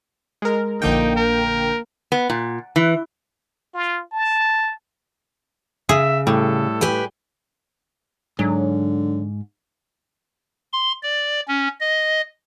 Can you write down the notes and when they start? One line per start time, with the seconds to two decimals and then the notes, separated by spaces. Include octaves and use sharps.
0.42 G#3 A#4
0.82 A#1 D3 A#3 D#4 G5
1.16 A#4
2.12 B3
2.30 A#2
2.76 E3
3.74 F4
4.12 A5
5.89 C#3 G#4 E5
6.27 A2 G3 A4
6.81 G4 B4 G#5
8.39 G#2 D3 F#3
10.73 C6
11.03 D5
11.48 C#4
11.81 D#5